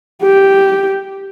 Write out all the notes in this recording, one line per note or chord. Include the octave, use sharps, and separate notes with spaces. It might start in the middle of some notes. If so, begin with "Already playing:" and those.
G4